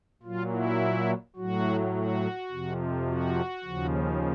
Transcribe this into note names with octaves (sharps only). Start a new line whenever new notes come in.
A#2 F#3 F4
E4
A2 F#3 F#4
F#4
F2 C3 F3
F#4
D#2 C#3 F3